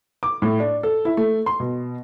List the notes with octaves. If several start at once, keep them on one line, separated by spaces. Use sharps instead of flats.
D6
A2
D4
A4
E4
A3
C6
B2